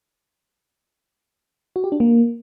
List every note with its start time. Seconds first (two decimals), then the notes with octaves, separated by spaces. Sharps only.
1.76 F#4
1.84 G4
1.92 D4
2.00 A#3